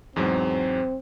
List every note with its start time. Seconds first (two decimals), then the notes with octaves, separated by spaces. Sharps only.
0.16 E2 G#2 F#3 C4